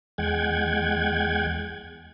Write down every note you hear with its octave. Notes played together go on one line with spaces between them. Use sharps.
E2 G#3 F#5 G5 G#6